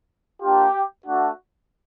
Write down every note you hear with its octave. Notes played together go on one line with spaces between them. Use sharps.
A#3 D4 F4 G4
A3 D4 F#4